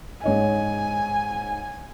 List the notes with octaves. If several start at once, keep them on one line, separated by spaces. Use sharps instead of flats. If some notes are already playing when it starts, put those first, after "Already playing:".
G#2 C#5 D#5 G#5